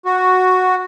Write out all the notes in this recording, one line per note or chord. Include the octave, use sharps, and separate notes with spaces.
F#4